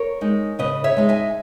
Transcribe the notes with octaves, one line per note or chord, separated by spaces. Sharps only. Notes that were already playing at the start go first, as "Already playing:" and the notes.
Already playing: A#4 C#5
G#3 D#4
C#3 B4 D#5
C#5 E5
G#3 D#4
E5 G#5